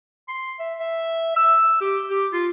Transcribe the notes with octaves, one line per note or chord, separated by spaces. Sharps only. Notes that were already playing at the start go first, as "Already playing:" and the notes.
C6
E5
E5
E6
G4
G4
F4